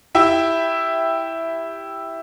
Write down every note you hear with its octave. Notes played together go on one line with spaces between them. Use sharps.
E4 G4 E5